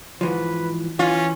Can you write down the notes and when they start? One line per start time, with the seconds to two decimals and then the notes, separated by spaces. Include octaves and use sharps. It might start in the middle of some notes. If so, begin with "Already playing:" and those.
0.21 G#2 E3 F3 B4
0.99 E3 C#4 F4